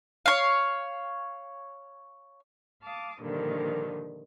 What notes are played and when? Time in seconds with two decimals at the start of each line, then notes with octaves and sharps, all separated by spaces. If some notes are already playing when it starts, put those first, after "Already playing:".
0.26 C#5 F5
2.82 F5 A5 D6 D#6
3.20 G2 A#2 D3 D#3 F3